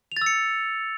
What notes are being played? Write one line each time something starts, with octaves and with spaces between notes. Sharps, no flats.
E6 A6 C#7 F7